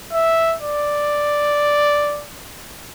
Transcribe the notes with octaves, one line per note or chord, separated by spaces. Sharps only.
E5
D5